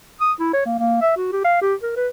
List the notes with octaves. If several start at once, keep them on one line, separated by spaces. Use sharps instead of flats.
D#6
E4
C#5
A#3
A#3
E5
F#4
G4
F5
G4
A#4
B4